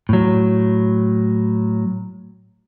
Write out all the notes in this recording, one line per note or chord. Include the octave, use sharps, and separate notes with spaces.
A2 F#3